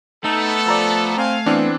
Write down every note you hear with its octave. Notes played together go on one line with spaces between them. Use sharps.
A3 B3 D#4 A4
F3 D5 A#5 E6
C4 F5 G#5
E3 B3 C4 D4